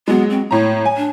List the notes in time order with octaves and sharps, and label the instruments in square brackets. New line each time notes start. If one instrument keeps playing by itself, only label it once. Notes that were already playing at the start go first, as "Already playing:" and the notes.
[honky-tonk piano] F#3 G#3 [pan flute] B3
[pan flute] C4
[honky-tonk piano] A2 A#5 [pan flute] C#5
[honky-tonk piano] G#5
[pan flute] D4